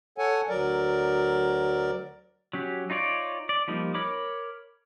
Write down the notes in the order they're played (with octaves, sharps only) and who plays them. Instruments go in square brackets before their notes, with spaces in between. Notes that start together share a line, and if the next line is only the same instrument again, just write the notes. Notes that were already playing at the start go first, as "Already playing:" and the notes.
[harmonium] A4 C#5 F#5 G#5
D2 F#3 A#4 D5
[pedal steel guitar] F#3 C#4 G4
D#4 F4 C#5 D5
D5
F3 G3 A#3 D#4
A#4 C#5 B5 D6